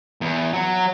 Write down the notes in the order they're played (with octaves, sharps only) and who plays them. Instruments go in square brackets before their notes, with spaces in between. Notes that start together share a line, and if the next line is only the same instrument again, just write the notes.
[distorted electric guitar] E2
F#3